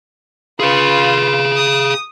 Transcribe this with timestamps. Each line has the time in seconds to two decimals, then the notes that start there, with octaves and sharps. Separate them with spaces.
0.60 F4 G#4 B4 F5
1.56 D#6